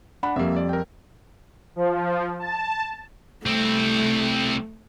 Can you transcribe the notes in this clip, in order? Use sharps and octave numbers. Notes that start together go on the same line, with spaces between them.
D4 F#5 B5
F2 G3 A#3 E5
D5
A#4 G5
F3
A5
C2 A3 C4